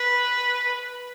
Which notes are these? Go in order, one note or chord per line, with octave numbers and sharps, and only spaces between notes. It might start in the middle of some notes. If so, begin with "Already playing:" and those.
Already playing: B4